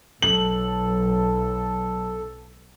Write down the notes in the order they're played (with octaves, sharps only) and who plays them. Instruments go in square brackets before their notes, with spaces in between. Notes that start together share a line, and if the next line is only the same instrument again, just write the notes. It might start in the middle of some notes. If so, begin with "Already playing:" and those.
[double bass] B1 [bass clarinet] F#3 [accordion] A4 [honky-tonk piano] F#7